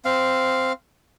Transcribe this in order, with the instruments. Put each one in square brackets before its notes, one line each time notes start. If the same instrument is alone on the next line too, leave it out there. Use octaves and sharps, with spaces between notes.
[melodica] C4 F5